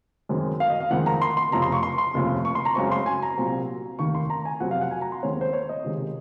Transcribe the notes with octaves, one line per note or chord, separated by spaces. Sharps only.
F#2 D#3 G#3 C4
F5
D#5
F5
F2 D#3 G#3 C4 F#5
A#5
C6
C6
F1 F2 C#3 A#5
C6
C#6
C6
C6
F1 D#2 C#3 F3
C#6
C6
A#5
F#2 C#3 G#3 C4 C#6
C6
G#5
A#5
C2 A#2 F#3 C4
F1 D#2 D#3 A#3 C#6
C6
A#5
G#5
F2 C3 F#3 C4 F#5
F5
F#5
G#5
A#5
C6
D#2 D#3 G#3 C4 C#5
C5
C#5
D#5
C#2 C3 D#3 G#3